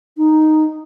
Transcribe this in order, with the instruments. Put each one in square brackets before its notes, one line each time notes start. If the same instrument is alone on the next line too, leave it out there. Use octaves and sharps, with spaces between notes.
[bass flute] D#4